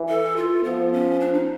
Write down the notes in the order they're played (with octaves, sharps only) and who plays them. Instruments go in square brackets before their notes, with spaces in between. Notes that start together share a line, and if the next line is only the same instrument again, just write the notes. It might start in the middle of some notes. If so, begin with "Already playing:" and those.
Already playing: [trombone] E3
[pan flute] A4
F4
[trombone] F3 [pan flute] B3
[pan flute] C#4
D4
D#4